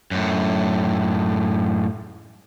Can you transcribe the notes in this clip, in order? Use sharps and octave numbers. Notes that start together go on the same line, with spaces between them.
F#2 A2